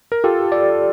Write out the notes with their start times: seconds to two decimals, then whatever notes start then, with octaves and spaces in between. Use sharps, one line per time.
0.12 A#4
0.24 F4 G4 A4
0.52 D5